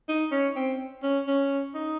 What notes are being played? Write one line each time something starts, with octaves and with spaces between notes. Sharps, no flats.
D#4
C#4
C4
C#4
C#4
D#4